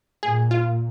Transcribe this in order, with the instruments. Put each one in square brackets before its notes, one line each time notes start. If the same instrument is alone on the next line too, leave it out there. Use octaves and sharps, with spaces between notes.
[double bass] A#2 [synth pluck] G#4
[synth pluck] F4